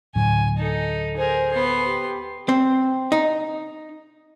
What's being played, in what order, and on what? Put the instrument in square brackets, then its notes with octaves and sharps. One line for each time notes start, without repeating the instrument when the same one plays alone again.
[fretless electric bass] D2 A2 F#3 [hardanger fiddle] G#5
[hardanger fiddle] D#4 A4
[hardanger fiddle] G#4 A#4 [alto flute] C5
[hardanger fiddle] B3 C6
[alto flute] G4
[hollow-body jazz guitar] C4
D#4